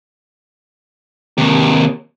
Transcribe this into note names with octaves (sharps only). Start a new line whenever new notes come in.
D#2 C3